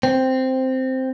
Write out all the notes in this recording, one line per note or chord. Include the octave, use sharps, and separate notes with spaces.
C4